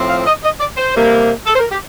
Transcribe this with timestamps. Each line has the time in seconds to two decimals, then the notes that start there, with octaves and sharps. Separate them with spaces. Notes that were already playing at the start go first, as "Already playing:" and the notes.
Already playing: A2 F3 C4
0.09 F5
0.26 D#5
0.44 D#5
0.60 D5
0.77 C5
0.95 C3 G3 A#3
1.47 A4
1.55 C5
1.59 A#4
1.71 G4